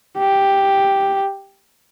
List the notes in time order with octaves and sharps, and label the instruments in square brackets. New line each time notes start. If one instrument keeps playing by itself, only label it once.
[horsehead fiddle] G4